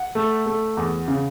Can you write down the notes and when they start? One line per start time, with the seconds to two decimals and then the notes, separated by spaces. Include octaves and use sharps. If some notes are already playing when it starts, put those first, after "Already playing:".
Already playing: F#5
0.15 A3
0.46 A3
0.77 E2
1.08 C#3